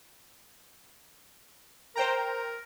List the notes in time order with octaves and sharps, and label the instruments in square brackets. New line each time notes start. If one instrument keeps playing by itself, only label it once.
[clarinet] A#4 [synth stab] C5 G5 A#5